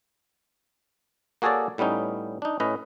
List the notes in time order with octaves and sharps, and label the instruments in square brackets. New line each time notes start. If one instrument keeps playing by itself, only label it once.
[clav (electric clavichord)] A#3 F#4 G#4 A4 C#5 D5
A2 G3 B3 C#4 D#4
D4 D#4
A2 C#4 B4 D#5